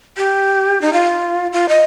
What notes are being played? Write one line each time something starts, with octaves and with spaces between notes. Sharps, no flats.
G4
D#4
F4
F4
D#5